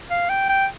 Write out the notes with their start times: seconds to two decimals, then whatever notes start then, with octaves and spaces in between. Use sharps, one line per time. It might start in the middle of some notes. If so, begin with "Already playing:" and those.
0.10 F5
0.29 G5
0.49 G5